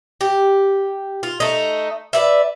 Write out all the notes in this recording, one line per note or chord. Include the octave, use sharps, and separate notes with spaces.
G4
F4
A3 D#4
B4 D5 E5